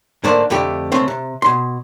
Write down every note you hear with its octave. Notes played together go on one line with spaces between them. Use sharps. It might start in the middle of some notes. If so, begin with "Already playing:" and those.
G#2 D3 A3 A#3 C5 D5
F2 D3 A3 G4
C#2 A3 C4 C5
C3
B2 C6